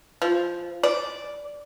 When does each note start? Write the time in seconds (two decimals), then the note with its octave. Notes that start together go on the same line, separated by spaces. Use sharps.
0.22 F3
0.83 D5